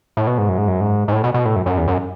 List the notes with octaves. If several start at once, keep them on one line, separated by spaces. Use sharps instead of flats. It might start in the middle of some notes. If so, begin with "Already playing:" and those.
A2
B2
G#2
F#2
G#2
F#2
G#2
G#2
A2
B2
B2
A2
F#2
F#2
E2
F#2